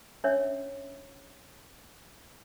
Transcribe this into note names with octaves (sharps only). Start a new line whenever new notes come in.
C#4 D4 C#5 E5